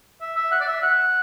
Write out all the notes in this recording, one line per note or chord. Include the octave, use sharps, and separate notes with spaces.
E5
E5
F#5
D5
E5
F#5